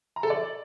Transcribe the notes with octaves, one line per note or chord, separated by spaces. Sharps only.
A#5
A4
D5